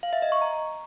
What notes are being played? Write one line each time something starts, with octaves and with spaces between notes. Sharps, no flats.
F5
E5
D#5
C#6
A#5